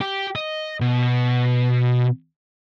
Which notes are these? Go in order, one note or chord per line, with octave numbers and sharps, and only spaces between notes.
G4
D#5
B2